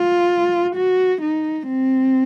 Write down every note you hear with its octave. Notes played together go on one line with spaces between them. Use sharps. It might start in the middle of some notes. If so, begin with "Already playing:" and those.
Already playing: F4
F#4
D#4
C4